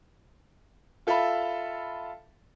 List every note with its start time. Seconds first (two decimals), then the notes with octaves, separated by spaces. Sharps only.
1.07 F4 A4 E5 F5 B5